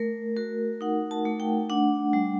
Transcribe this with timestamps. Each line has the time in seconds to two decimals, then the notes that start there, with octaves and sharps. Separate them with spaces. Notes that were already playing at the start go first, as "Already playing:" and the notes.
Already playing: A3 A#4
0.37 F#4 A#4
0.81 D#4 F#5
1.11 A5
1.25 A3
1.40 G5
1.70 D4 F#5
2.13 G3